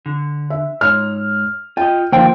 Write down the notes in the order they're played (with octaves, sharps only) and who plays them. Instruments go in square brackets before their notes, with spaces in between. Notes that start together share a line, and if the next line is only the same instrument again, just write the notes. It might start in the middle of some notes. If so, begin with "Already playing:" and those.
[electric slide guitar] D3
[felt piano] E5
[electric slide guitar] G#2 C#5 [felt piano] F6
[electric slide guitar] F4 D#5 [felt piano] G5
[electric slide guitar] D3 D#3 F3 [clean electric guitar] A#3 G5 [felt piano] C5